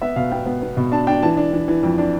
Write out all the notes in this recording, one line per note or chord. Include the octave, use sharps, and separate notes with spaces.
B3 E5
B2 F5
B3 G5
B3
B3
B2
D4 A5
D4 G5
E3 A5
D4
E3
E3
F2
D4